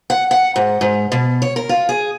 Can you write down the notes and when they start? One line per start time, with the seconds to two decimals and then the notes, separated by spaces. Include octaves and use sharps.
0.10 F#5
0.31 F#5
0.56 G#2
0.81 G#2
1.12 B2
1.42 C#5
1.56 A#4
1.69 F4
1.89 G#4